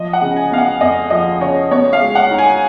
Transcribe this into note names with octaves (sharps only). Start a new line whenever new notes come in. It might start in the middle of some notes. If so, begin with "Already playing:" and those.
Already playing: F3 D#5
F#5
C#3
G#5
B3 F5
F#5
F2 D#5
F3 D#5
C#3 C#5
B3 C#5
F5
G#3
F#5
D#4
G#5